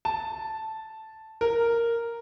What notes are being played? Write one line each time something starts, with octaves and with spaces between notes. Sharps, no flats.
A5
A#4